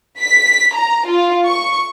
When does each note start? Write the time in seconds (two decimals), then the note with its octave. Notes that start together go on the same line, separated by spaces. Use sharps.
0.20 B6
0.74 A#5
1.07 F4
1.46 C#6